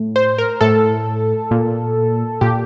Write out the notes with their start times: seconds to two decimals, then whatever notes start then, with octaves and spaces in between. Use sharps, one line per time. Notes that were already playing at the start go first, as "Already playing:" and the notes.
Already playing: A2
0.16 C5
0.38 A#4
0.61 A2 A4
1.51 A#2
2.41 A#2 G4